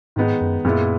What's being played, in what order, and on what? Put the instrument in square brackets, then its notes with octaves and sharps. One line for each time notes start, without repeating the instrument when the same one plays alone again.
[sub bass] G#2 [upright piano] D#3 G#3 B3 D#4
[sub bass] F#2
[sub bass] F#2 [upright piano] A#2 G#3 B3 E4